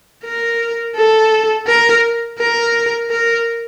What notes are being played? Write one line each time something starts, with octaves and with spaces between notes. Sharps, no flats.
A#4
A4
A#4
A#4
A#4